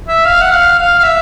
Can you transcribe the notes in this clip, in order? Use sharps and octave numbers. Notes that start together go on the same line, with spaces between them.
E5
F5
F#5
F5
F5
F5
E5